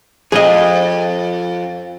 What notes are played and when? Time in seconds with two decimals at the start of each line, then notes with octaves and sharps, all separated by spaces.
0.32 F2 G#4 D#5